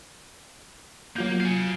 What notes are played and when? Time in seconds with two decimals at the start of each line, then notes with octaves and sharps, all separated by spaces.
1.16 F#3 A#3 F4 G6
1.40 F5 G#5